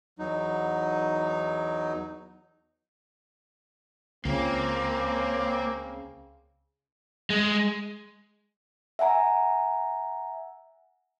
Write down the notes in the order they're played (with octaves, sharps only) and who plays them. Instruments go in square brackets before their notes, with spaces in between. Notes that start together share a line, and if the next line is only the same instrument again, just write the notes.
[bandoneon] E2 F#3 D#4
[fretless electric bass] C#2 [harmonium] C#3 [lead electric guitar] A#3 [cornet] C4
[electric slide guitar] G#3
[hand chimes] E5 F#5 G#5 A#5